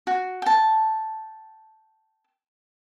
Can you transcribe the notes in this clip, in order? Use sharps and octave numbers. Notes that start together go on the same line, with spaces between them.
F#4
G5 A5